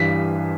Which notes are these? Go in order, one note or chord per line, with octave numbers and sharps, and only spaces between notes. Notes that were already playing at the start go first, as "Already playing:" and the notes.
Already playing: G2 E3 B6